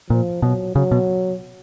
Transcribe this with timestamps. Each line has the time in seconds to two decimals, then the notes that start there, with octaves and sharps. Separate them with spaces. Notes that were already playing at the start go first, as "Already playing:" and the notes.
0.10 A#2 F3
0.42 B2 F#3
0.75 C#3 F#3
0.91 B2